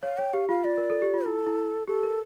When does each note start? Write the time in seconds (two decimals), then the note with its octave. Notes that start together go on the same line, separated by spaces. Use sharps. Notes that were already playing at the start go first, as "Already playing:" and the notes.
0.03 C#5 F5
0.18 C#5 G5
0.33 G4 F5
0.49 F4 F5
0.64 F4 D5
0.78 A#4
0.90 A4
1.02 G4
1.14 F4
1.26 E4 A4
1.46 E4
1.88 G4 A4
2.03 A#4